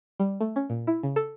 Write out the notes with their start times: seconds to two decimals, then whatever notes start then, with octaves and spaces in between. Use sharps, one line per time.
0.20 G3
0.41 A3
0.56 C#4
0.70 A#2
0.87 E4
1.03 C#3
1.16 A4